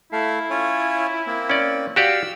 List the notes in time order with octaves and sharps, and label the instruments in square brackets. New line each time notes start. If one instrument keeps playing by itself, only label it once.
[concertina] A3 A4 F5 [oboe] E4
[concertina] C#4 F4 C#5
A#3 C4
[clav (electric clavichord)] C#4 D5
[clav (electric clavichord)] F#4 G4 D5 [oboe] F5 [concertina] E6